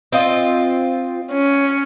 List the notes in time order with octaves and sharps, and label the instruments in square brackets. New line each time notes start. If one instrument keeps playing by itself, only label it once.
[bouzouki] C4 F4 D#5
[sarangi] C#4